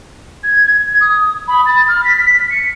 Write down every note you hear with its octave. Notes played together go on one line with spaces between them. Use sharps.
G#6
G#6
D#6
B5
A6
F6
B6
C#7